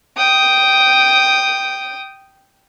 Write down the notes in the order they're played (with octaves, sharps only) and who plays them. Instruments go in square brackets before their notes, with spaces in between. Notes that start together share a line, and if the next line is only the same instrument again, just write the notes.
[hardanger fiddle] G5 D#6